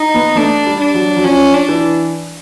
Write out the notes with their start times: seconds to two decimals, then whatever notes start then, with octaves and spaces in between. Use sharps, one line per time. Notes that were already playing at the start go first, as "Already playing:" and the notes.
Already playing: D#4
0.14 B3
0.36 A3 D4
0.66 G3
0.81 D4
0.94 F#3
1.17 F#3
1.24 F3 C#4
1.54 D4
1.69 E3